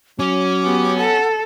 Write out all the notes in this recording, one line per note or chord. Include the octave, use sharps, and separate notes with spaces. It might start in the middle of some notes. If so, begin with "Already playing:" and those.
F#3 C#4 D6
B3 G4
A4 F#5